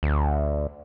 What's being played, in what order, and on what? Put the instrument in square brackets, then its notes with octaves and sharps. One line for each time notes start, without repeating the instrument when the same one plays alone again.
[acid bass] D2